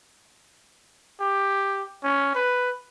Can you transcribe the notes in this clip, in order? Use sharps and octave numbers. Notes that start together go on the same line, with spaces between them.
G4
C#4
B4